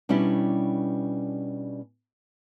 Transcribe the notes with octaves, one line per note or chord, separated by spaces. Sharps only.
B2 G3 C#4 D4 E4 G4